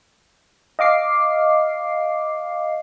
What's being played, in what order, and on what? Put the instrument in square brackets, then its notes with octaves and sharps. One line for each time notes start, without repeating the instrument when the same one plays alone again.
[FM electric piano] D#5 F5 D6 C7